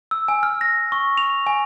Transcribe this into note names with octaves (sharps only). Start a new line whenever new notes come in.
E6
G#5
F6
A#6
C#6
F7
G#5